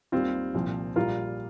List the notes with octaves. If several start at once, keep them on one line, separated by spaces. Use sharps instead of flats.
D#2 D#3 G3 C4 F4
C2 A#2 F3
A#1 A#2 G3 F4 A#4